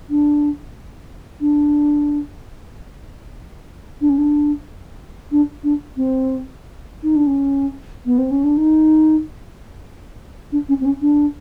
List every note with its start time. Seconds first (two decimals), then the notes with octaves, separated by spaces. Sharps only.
0.10 D4
1.41 D4
4.01 D4
4.09 C#4
4.18 D4
5.32 D4
5.63 D4
5.97 C4
7.03 D#4
7.16 D4
7.27 C#4
8.06 B3
8.18 C4
8.31 C#4
8.44 D4
8.57 D#4
10.52 D4
10.69 C#4
10.81 C4
10.85 C#4
11.01 D4